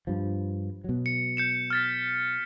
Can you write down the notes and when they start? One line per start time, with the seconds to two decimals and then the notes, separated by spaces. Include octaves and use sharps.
0.07 G2 F3
0.84 B2 F#3
1.06 C#7
1.37 G6 C#7 E7
1.71 F6 A6 B6